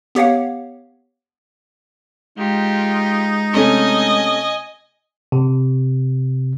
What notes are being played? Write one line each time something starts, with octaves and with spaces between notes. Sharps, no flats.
B3 G4 C#5 F5 F#5
G#3 D#4 F4 G4
C3 A3 C#4 D#5 G#5
C3